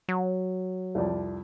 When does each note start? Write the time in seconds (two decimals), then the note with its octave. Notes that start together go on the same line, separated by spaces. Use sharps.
0.08 F#3
0.95 C2 F2 D5